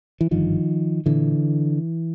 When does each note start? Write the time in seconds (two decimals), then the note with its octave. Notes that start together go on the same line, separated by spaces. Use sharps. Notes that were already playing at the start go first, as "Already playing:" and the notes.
0.21 E3
0.31 G#1 G2 D3 D#3 F3
1.06 A#2 D3 E3